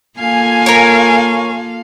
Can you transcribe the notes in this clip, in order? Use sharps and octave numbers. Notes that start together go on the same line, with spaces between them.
A#3 F4 A4 F5 G#5
A#4 C#5